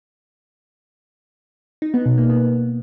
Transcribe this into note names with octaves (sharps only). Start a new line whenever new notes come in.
D#4
B3
B2
A#3
B3